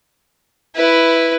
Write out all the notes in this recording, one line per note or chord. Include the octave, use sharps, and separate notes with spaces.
E4 B4